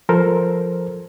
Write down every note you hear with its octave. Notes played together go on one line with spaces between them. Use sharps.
F3 A4 A#4 C5